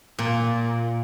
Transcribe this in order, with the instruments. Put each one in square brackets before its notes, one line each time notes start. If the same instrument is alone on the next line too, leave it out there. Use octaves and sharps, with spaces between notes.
[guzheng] A#2